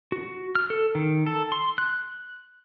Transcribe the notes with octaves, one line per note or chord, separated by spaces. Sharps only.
F#4
F6
A4
D#3
A4
C6
F#6